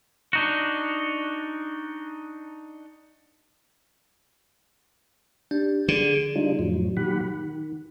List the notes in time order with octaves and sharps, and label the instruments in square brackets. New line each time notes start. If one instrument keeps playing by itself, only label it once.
[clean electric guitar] D4 D#4 F#4
[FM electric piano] D4 [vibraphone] G4
[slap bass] D3 [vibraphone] G#4
[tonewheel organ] D3 G3 G#3 D4 D#4 F4
F2 A2 F3 F#3
A#2 D#3 F#3 G4 F#5 B5
D#3